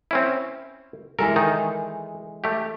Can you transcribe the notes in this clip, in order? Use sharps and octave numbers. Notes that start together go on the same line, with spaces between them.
C4 C#4 E4
E3 G#3 A4 A#4
D#3 D#4
A3 G4